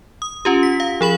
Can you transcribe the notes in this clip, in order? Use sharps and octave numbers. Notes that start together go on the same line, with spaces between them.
D#6
C#4 F4 G4
B6
F5
F3 G#4 B5 F#7